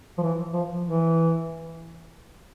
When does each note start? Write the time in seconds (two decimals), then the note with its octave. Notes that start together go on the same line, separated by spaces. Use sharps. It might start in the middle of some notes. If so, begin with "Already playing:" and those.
0.18 F3
0.22 E3
0.53 F3
0.86 E3